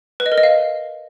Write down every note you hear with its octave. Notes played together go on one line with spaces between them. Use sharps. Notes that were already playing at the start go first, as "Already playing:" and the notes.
B4
D#5
A#4
D#5
F5